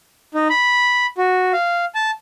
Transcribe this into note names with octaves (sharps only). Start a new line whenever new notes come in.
D#4
B5
F#4
F5
A5